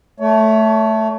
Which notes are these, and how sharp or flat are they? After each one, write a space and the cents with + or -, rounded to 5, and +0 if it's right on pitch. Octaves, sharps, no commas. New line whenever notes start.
A3 +0 C#5 +30